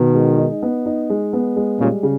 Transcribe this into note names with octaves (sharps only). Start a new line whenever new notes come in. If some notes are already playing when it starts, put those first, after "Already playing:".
Already playing: B2 D#3 B3
G#3
D#4
B3
D#4
G#3
B3
G#3
A#2 C#3 G3
C#3